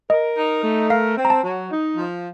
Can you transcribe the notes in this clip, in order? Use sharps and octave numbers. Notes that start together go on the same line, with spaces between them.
A#4 D#5
D#4
A3
A#4 F5
C4
A#5
A5
F#3
D#4
F3